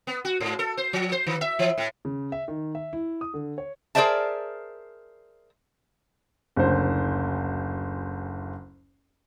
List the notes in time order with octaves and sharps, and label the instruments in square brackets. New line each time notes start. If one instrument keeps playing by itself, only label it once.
[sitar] B3
F#4
G#2
A4
C5
F3
C5
D#3
E5
E3
A2
[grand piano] C#3
E5
D#3
E5
E4
D#6
D3
C#5
[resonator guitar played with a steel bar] G#4 A#4 C5 D5 E5 A5
[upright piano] F#1 D2 C5